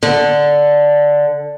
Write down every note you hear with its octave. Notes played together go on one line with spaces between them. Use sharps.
D3